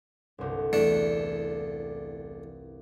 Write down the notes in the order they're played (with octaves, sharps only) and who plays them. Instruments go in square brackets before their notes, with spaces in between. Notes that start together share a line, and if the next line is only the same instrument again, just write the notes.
[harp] G1 C2
[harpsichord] E2 A3 D4